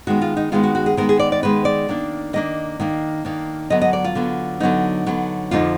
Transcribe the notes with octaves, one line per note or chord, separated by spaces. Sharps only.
D#3 G#3 B3 F#4
F4
D#4
D#3 G#3 B3 F4
F#4
F#4
G#4
D#3 G#3 B3 A#4
G#4
D5
D5
D#3 G#3 B3 B4
D5
D#3 A#3 D4
D#3 A#3 D4 D#5
D#3 A#3 D4
D#3 A#3 D4
D3 F#3 B3 D#5
D#5
D5
F4
D3 F#3 B3
D3 F#3 B3 D#4
D3 F#3 B3
F2 D3 F3 A#3 D#4 F4